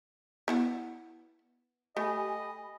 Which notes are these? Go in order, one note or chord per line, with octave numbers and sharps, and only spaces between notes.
B3 E4 F#5
A3 G4 D#5 G#5 B5